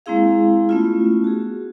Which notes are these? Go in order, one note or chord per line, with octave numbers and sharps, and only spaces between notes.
G#3 A#3 C4 E4 G#4 F5
A3 B3 C#4 E4 F4
F#4 G#4